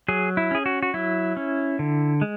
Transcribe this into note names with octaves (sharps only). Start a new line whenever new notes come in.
F#3 G#4
E4
C#4 G#4
F#4
F#4
F#3 E4
C#4
D3
G#3